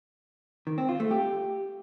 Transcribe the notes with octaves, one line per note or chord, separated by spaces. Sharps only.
D#3
C4
F4
A3
G4